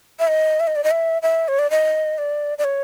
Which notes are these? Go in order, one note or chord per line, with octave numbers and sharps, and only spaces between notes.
E5
D#5
E5
D#5
D5
D#5
E5
E5
C#5
D5
D#5
D5
D5
C#5